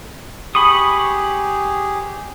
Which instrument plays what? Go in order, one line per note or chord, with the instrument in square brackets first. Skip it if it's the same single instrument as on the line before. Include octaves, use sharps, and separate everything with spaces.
[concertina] G4 G#4 [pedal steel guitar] B5 C#6 D#6